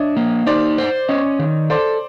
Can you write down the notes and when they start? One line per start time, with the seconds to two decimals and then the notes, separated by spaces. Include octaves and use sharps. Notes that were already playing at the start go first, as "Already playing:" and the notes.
Already playing: D4 C#5 D#5 E5
0.17 A#3
0.46 D#4 C5 D5
0.78 C5
1.09 C#4 C#5 D#5
1.39 D#3
1.70 A4 C5 D5